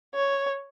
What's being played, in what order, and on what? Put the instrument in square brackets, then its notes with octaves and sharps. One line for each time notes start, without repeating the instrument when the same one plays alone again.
[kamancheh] C#5